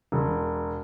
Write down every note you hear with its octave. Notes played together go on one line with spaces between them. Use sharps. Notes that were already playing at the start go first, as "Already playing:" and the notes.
E1